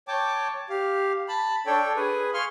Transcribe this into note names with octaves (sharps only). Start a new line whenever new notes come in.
C#5 G5 A5 D6
G4 F5
A5 B5
D4 A4 C#5 G5
G#4 B4 G#5
F5 G#5 C6 C#6 F6